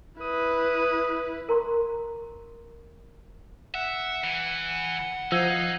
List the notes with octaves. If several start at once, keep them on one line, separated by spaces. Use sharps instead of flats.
E4 B4 D#6
A#4 A#5 C6 C#6
E5 F#5
E3
F3 D#4 E6 G#6 C7